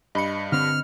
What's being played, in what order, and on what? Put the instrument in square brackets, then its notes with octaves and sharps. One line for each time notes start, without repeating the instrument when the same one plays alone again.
[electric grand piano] G2 [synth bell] D#5 B5 C#7
[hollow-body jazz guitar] D3 C4 [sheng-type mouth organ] F6